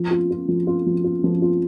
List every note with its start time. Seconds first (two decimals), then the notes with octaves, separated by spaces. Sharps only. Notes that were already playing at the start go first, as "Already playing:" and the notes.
Already playing: F3
0.11 F4
0.30 F4
0.48 F3
0.67 F4
0.86 F3
1.04 F4
1.24 F3
1.42 F4